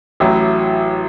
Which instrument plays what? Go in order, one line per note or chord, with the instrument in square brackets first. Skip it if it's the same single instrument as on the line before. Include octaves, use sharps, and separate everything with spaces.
[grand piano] A1 A2 F#3